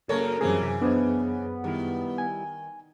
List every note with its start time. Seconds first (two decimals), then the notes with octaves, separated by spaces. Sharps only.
0.09 F#2 C#3 A#3 A4 A#4 C#5
0.41 F#2 C#3 E3 G3 A3 C4 G#4
0.61 C3 E5
0.81 B3 D4 C5 D#5
1.64 D#3 G3 E4
2.18 G#5